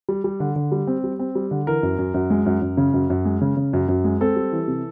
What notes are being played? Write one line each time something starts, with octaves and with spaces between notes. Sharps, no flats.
G3
G3
D3
D3
G3
C4
G3
C4
G3
D3
E3 A#4
F#2
F#2
F#2
G#3
F#2
F#2
C#3
F#2
F#2
G#3
C#3
C#3
F#2
F#2
G#3
C4 A4
G3
E3
C3